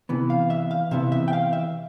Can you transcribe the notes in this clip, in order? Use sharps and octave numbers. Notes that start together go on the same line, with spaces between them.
C3 E3 B3
F5
E5
F5
C3 E3 B3 E5
E5
G5
F5
E5